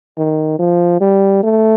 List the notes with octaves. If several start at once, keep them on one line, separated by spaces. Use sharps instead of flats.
D#3
F3
G3
A3